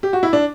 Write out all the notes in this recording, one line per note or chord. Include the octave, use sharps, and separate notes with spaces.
G4
F#4
E4
D4